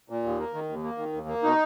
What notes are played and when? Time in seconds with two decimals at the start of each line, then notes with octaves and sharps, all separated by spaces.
0.10 A#2
0.23 D#2
0.39 A#3
0.54 D#3
0.69 D#2
0.83 A#3
0.98 D#3
1.13 D#2
1.28 A#3
1.43 B2 D#4